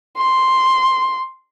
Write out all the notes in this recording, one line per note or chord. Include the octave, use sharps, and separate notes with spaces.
C6